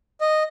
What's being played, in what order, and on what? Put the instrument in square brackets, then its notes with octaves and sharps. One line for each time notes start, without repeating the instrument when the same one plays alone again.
[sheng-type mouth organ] D#5